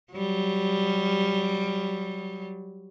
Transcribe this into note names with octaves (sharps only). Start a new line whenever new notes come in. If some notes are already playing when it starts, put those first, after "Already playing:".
F#3 G3